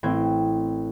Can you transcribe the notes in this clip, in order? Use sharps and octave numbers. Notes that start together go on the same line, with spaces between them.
A1 E3 C4 G5 G#6